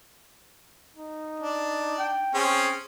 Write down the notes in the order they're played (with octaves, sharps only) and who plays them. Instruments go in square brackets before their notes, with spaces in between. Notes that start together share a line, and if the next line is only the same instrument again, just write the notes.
[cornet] D#4
[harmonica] D4
[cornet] G5
[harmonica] C4 C#4 [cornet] G#4